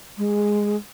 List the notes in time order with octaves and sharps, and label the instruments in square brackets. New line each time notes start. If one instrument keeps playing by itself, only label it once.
[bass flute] G#3